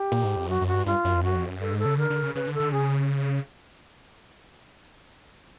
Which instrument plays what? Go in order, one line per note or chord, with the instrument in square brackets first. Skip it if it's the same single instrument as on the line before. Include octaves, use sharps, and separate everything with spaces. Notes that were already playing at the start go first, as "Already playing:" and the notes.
Already playing: [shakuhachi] G4
[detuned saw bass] A#2
G#2
F2
[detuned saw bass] F#2 [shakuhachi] F#4
[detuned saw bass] F#2
[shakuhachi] F#4
[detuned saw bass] G2
[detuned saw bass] G2 [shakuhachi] F4
[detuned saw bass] F#2
F2
[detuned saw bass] F#2 [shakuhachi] F#4
[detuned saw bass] F2
F#2
[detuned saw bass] G2 [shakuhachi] A4
[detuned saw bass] G#2
[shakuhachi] A4
[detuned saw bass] C#3
[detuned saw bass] D3 [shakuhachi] A#4
[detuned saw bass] D3
C#3
[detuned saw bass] C#3 [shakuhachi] B4
[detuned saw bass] D3
[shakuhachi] A4
[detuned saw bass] D3
[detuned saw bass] C#3 [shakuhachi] G#4